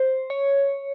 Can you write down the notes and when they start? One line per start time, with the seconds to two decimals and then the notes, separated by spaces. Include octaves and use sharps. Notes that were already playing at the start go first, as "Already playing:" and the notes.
Already playing: C5
0.30 C#5